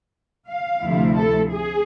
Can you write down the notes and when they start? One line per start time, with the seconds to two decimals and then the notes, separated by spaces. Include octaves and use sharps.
0.49 F5
0.84 D2 C3 F3 A3 E4
1.18 A4
1.53 G#4